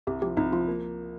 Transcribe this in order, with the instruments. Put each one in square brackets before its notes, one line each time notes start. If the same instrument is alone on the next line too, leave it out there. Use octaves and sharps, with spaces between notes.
[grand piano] C2 [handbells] G4
[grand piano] F3 [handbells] G4
[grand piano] C2 [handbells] D#4
[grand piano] F3 [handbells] F4
[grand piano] A#3